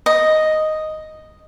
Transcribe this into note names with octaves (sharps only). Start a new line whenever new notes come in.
D#5